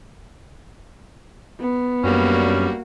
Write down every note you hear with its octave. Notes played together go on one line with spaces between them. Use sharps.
B3
F#2 G3 A#3 C#4 D4 F#4